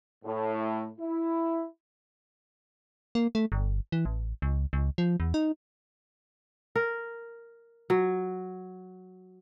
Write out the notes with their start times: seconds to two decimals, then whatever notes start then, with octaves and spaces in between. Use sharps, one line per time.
0.24 A2
0.99 E4
3.15 A#3
3.35 A3
3.52 G1
3.92 E3
4.05 A1
4.42 C#2
4.73 C#2
4.98 F3
5.20 E2
5.34 D#4
6.76 A#4
7.90 F#3